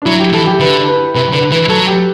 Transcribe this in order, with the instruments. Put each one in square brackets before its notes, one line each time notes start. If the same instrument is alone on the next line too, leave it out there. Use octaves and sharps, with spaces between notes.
[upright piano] D4
[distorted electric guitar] F#3 [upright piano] E4
[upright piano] G4
[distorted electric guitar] E3 [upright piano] A4
[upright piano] G4
[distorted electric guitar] D3 [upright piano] B4
[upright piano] B4
[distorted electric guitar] C3 [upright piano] B4
[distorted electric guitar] D3 [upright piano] B4
[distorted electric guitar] E3 [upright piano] B4
[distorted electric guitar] F#3 [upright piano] A4
[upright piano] G4